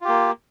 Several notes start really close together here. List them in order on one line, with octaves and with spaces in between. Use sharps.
F4 G4 A#3